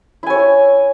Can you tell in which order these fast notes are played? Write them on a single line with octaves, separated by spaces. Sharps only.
E4 G#5 C#5